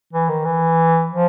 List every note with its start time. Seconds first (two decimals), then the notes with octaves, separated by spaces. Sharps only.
0.13 E3
0.29 D#3
0.45 E3
1.09 F3